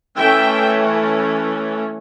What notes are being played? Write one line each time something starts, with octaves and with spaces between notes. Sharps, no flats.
E3 A3 C#4 E5 G5